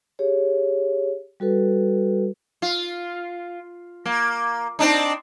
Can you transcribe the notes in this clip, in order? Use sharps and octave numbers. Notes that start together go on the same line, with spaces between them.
G4 G#4 C#5
G3 F#4 A4 B4
F4
A#3
C4 D4 D#4